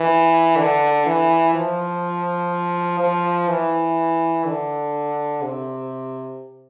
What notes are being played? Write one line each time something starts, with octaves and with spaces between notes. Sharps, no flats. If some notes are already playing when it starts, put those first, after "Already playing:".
Already playing: E3
D3
E3
F3
F3
E3
D3
C3